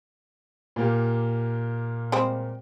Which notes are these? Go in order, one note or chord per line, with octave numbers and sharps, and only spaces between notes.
A#2 A#3 G4
G3 G#3 C4